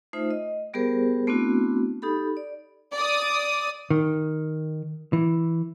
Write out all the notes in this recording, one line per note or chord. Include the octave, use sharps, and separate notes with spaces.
A3 D#4 F4 C5 E5
D#5
G3 B3 G4 G#4 A#4 C5
A3 B3 C4 D4 E4 F#4
D#4 G4 A4 B5
D5
D5 D#6
D#3
E3